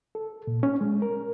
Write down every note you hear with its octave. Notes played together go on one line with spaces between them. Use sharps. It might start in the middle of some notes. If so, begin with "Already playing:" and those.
A4
A#2
C#4
G#3
A#4